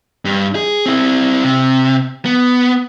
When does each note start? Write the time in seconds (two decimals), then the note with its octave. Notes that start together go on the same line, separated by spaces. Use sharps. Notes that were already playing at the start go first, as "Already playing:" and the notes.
0.25 G2
0.55 G#4
0.86 C4 E4
1.44 C3
2.25 B3